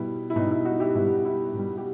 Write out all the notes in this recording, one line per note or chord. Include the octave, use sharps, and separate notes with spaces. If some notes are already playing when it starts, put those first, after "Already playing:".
Already playing: B2 G3 E4
E4
B2 G3 D#4
E4
D#4 F#4
E4 G4
B2 G3 E4
E4
B2 G3
G4